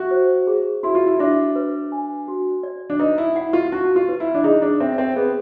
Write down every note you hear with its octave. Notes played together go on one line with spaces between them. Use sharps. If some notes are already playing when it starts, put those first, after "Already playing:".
Already playing: F#4 E5
C5
G#4
E4 F#4
F4
E4
D4 E5
B4
G#5
F#4
D5
D4
D#4 B4
E4
E4 F#5
F4
D#4 F#4
F4
B4
E4
D4
D#4 G#4
D4
C4 E5
C4
B3 G#4